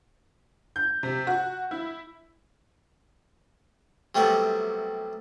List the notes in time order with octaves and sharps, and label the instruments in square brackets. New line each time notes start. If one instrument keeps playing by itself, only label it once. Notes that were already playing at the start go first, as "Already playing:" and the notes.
[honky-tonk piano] G6
C3
F#4
E4
[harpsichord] C3 F#3 G3 A3 B3 F#4